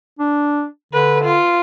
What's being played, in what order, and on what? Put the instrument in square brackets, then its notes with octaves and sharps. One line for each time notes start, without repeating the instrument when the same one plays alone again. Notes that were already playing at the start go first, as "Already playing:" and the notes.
[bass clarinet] D4
[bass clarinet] D3 [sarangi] B4
[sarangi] F4